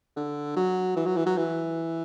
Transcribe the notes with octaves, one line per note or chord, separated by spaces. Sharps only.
D3
F#3
E3
F#3
E3
F#3
E3